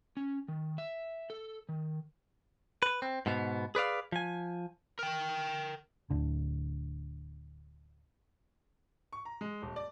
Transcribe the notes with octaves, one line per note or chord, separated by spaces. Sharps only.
C#4
D#3
E5
A4
D#3
B4
C4
G#2 B2 B3
G#4 B4 D5 F5
F3 G#5
A#4 G5
D1 D2 D3
C#6
A#5
G#3
D#1
D5